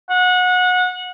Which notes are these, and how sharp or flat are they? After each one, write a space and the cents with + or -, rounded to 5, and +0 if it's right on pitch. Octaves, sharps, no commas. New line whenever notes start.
F#5 -25